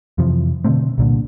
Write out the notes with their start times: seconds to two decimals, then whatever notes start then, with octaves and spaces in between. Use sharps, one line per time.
0.18 F2 C3 E3 F3
0.64 B2 D3 A3 C4
0.98 C2 A#2 D3